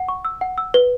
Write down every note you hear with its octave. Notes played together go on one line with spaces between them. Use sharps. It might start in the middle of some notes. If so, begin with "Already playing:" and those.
Already playing: F#5
C#6
E6
F#5
E6
B4